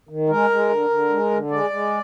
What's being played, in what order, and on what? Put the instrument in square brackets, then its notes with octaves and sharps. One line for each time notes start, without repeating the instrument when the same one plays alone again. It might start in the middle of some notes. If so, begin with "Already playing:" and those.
[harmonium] D#3
G#3 A#4
G#3
D3
D3
G#3
D3
G#3 D5
G#3